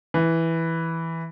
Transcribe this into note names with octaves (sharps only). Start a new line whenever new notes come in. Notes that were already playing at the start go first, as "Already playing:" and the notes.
E3